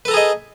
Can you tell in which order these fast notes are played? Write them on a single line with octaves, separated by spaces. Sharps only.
B4 A4 A#5 G#4 D#5